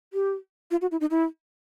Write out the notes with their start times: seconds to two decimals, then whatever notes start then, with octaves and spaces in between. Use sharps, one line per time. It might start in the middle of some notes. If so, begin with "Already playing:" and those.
0.13 G4
0.71 F4
0.81 F#4
0.92 E4
1.01 D#4
1.11 E4